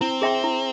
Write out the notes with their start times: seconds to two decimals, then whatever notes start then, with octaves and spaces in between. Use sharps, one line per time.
0.01 C4 E4
0.22 G#4 E5 G5 C6
0.44 E4